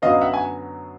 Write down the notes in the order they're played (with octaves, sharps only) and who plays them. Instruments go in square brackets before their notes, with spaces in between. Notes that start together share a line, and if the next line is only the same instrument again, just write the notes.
[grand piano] F#2 D3 F#3 B3 D#5 F5
E5 F#5
G#5